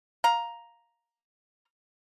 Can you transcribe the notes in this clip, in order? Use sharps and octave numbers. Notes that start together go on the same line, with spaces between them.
F5 A#5